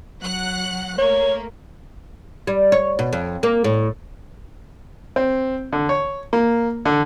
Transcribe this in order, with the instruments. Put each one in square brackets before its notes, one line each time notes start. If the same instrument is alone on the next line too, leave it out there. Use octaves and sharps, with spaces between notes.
[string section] F#3 F#5 F#6
[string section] A3 A#3 [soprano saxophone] C#5
[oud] G3
C#5
B2
F2
A#3
A2
[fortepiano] C4
D3
C#5
A#3
D3